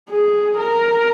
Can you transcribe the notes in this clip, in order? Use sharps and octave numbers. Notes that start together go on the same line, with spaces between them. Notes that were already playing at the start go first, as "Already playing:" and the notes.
G#4
A#4